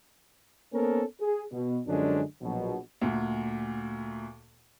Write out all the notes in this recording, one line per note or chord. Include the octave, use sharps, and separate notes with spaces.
A#3 B3 C#4 A4 A#4 C5
G#4
B2
F#2 D3 F3 G#3 C#4 D4
A#1 B2 F#3
D2 A#2